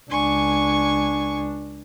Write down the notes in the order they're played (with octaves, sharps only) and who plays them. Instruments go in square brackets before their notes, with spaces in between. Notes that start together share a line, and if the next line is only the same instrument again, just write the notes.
[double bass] C#2 D4 [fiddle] G#5 C#6